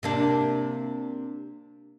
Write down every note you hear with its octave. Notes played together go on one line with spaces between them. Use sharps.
C3 A#3 D4